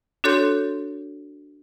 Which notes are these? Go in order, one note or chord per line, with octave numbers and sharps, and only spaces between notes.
D4 F#4 A4 C#5 C6 G6